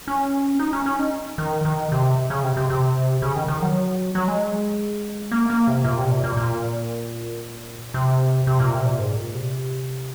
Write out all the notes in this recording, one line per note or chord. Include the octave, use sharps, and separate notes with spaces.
C#4
D#4
C#4
C#4
D#4
D#3
D#3
C3
C#3
C3
C3
C3
C#3
D#3
D#3
F#3
F#3
G#3
A#3
A#3
C3
A#2
C3
A#2
A#2
A#2
C3
C3
A#2
C3
A#2
G#2
A#2
C3